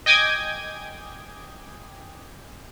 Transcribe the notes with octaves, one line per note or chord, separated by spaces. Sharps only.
D#5 G5 G#5 D6 D#6 G#6